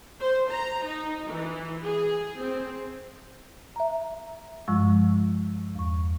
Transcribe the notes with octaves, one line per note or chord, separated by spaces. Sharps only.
C5
A#5
D#4
E3
G#4
C4
E5 A#5
G2 F3 G#3 C#6 E6
E2 C#6